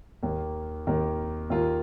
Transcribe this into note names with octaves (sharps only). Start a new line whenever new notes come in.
D#2 D#3 A#3
D#2 D#3 A#3
D#2 D#3 A#3 F4